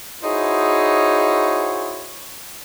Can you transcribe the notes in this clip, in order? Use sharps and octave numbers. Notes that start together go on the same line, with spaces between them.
D#4 E4 F#4 G#4 C5 C#5